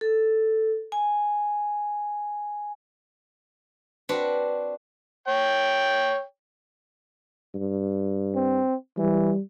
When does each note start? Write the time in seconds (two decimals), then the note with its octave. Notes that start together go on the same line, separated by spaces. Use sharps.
0.01 A4
0.92 G#5
4.09 C4 D4 F#4 B4 F#5
5.28 C#5 G5
7.55 G2
8.35 C4
8.98 E3 G3